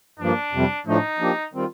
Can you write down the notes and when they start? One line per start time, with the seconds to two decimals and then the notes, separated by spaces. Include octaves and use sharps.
0.19 G2 F3 A#3 D4
0.52 F2 C3 G3
0.86 A2 F3 A3 D4 D#4
1.19 F3 A#3 D4 G4
1.53 D#3 G3 C4 F4